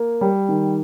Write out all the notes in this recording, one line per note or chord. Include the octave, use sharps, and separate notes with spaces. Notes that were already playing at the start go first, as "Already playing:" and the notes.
Already playing: A#3
G3
D#3